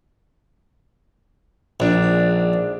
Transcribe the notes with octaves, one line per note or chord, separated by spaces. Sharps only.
A#1 G#2 D4